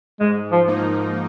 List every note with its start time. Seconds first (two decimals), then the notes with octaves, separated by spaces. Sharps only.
0.20 G#2 G#3
0.52 F3
0.68 F3 A#3 D#4